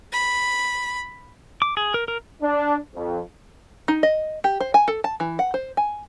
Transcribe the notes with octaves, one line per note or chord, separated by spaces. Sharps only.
B5
D6
G#4
A#4
A#4
D4
F2
D#4
D#5
G4
C5
G#5
A4
A5
E3
F#5
C5
G#5